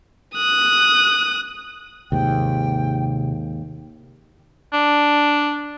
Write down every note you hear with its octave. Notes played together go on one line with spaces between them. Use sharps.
D#6 F#6
D#2 G#2 C3 G5
D4